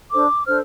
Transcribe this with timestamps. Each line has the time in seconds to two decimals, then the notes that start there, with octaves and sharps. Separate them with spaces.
0.11 D4 A4 C5 D6
0.46 D4 A4 C5 F6